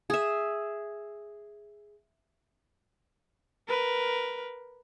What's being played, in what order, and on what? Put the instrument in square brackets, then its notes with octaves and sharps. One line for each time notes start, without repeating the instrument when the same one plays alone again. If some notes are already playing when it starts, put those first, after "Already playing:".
[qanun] G#4 E5
[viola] A#4 B4